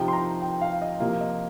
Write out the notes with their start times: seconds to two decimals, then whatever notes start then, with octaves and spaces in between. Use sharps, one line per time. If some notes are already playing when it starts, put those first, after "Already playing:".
Already playing: C3 F3 D#4 G5
0.08 C6
0.13 A#5
0.42 G5
0.61 F5
0.82 D#5
1.00 C3 F3 A#3 F4
1.21 D#5